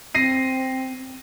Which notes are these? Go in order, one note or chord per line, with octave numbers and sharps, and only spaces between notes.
C4 A#6 C7 D#7